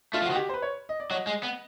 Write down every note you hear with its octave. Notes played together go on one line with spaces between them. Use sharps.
A3 F4
F3
F#4
D#3
G4
C5
B4
C#5
D#5
D5
F#3 D#5
G#3
B3